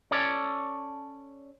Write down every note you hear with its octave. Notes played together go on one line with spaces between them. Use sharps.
C#4 A4 C#5 D5